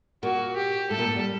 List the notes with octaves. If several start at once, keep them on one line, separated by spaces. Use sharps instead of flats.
A#2 A#3 F#4
G4
A2 A3 A4
A#2 A#3
A2 A3
G3